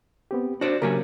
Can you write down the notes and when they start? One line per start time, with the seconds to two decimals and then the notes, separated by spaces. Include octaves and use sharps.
0.31 B3 C4 G4
0.61 D4 F#4 C5 D5
0.82 C#3 F#3 A#3 G4 A#4 G#5